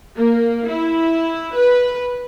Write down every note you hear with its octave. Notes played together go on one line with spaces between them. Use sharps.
A#3
E4
B4